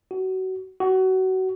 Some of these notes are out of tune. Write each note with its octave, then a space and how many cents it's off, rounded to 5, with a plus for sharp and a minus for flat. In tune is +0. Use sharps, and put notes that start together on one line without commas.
F#4 +25
F#4 +25